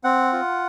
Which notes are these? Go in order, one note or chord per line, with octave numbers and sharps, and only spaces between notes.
C4 F#5
F4